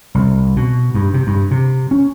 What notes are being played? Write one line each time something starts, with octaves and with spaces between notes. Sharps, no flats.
C2
B2
G2
C3
G2
C3
C#4